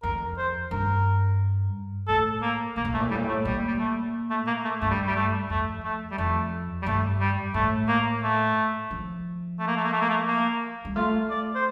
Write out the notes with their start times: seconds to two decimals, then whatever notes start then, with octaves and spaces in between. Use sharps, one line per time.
0.03 F2 A#4
0.38 C5
0.71 G2 A#4
2.08 A2 A4
2.42 A#3
2.76 A2 A#3
2.85 A#2
2.92 A2 A3
3.00 A#2
3.08 A2
3.10 G3
3.15 A#2
3.23 A2
3.28 A3
3.45 A#2 G3
3.68 G3
3.79 A3
4.30 A3
4.47 A#3
4.64 A3
4.81 G2 A3
4.90 G3
5.07 G3
5.15 A3
5.50 F2 A3
5.83 A3
6.11 G3
6.18 F2 A3
6.82 G3
6.86 G2 A3
7.20 G3
7.54 A2 A3
7.88 A#3
8.23 A3
8.91 F3
9.59 A3
9.67 A#3
9.76 A3
9.84 A#3
9.93 A3
10.01 A#3
10.09 A3
10.28 A#3
10.85 G3
10.96 A3 F4
11.30 D5
11.55 C5